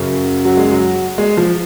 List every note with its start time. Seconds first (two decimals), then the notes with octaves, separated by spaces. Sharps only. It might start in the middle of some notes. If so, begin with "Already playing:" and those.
Already playing: F#2 C#3
0.45 F#3
0.57 G#3
0.71 F#3
1.18 G#3
1.37 F3